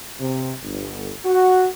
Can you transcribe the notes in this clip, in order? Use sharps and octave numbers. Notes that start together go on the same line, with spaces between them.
C3
G1
F#4